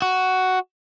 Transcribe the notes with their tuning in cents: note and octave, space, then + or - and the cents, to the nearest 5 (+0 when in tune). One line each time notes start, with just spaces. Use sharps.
F#4 +5